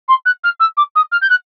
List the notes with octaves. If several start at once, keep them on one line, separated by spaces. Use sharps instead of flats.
C6
F#6
F6
E6
D6
D#6
F6
G6
F#6